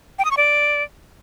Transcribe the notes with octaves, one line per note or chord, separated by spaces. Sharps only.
G5
D#6
C#6
D5